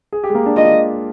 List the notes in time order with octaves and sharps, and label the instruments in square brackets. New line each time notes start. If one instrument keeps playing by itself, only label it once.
[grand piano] G#4
G4
G#3
A#3
D4
[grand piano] F4 [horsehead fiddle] D#5